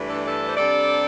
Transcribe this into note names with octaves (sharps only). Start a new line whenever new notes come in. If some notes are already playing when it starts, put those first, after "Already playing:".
Already playing: G2 E3 A3 D4
A4 D5
A4 D5
C5
C3 G3 D4 A4 D5